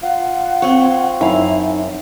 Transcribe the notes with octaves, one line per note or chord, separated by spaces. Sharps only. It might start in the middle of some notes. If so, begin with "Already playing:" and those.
F4 F#5
C4 C#5
F#2 D#4 E4 F5